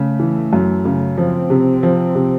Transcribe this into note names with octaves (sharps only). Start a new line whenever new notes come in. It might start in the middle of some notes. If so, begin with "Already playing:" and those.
Already playing: C#3 A3
E3
F#2
C#3
F3 C4
C3
F3
C3